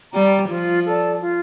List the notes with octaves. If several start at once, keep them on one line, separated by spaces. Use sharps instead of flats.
G3 D5 G5 A#5
F3 F4
A4 D5 A5
F4